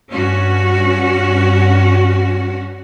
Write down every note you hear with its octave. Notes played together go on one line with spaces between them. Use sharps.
G2 C#4 F#4